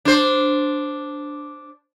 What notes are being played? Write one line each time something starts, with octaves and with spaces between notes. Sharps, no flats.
D4 C5